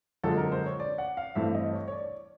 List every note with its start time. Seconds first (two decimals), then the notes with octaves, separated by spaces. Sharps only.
0.23 F#2 D3 F3 G#3 C4 A4
0.37 A#4
0.52 C5
0.66 C#5
0.80 D5
0.98 F#5
1.17 F5
1.35 G2 E3 A3 C4 E5
1.55 D#5
1.73 C#5
1.88 C#5
1.92 D5